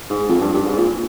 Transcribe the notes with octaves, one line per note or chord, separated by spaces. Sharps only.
G#2
F2
G2
G2
G#2
A#2